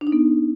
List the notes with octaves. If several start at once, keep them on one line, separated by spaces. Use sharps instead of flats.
D4
D#4
B3